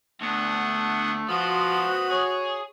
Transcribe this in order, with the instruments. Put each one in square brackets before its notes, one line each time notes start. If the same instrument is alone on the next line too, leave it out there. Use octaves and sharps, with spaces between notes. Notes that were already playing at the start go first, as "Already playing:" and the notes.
[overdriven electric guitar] D2 [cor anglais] A3 [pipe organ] B3 D4 F#5
[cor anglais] F3 [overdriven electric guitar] B3 C5 [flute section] F#4 D#6 [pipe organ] B5
[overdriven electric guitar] G#4 [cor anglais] C#5